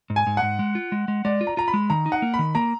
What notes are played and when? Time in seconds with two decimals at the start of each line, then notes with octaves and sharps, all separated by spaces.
0.10 G#2
0.16 G#5
0.27 G#2
0.37 F#5
0.42 G#2
0.59 G#3
0.75 F4
0.92 G#3
1.08 G#3
1.25 G#3 D5
1.41 F4
1.47 A#5
1.57 F4 A#5
1.68 B5
1.74 G#3
1.90 D#3 A#5
2.06 D#4
2.12 F#5
2.22 A#3
2.34 B5
2.39 D#3
2.55 A#3 A#5